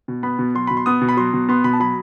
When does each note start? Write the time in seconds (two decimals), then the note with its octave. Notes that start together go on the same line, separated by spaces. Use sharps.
0.08 B2
0.23 B3 B5
0.39 B2
0.55 F#3 C6
0.67 B2 B5
0.77 C6
0.86 B3 D#6
1.01 B2
1.09 B5
1.17 F#3 C6
1.33 B2
1.49 B3 C6
1.64 B2 B5
1.73 A5
1.80 F#3 B5